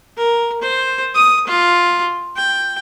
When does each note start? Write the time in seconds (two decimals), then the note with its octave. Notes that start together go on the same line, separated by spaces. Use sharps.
0.17 A#4
0.61 C5
1.14 D#6
1.47 F4
2.37 G5